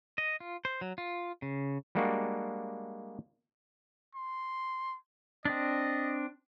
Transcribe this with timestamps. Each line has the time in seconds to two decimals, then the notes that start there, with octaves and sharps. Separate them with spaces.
0.18 D#5
0.40 F4
0.65 C5
0.81 F#3
0.98 F4
1.42 C#3
1.95 G3 G#3 A#3 D4 F#4
4.15 C6
5.45 C4 D4 D#5